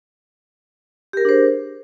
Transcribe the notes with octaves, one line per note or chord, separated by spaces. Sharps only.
D4 G4 G#4 A#4 C5